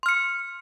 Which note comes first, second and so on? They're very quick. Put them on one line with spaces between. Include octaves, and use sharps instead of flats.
C6 F6 C#7